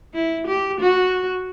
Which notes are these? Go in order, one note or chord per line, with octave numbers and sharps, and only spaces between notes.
E4
G4
F#4